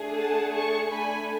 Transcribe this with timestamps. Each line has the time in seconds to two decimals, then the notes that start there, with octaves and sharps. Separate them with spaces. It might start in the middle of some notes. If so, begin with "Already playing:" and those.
Already playing: A3 D4 G#4
0.19 F#5 A5
0.55 A5 C#6
0.90 A3 D4 A4 G#5 B5